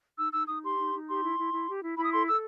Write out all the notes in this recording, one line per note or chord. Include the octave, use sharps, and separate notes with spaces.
D#4 E6
D#4 E6
D#4 D#6
G4 C6
D#4
D#4
G4 C6
E4
E4
E4
G4
E4
E4 B5
D#6
A4 C6
A4 E6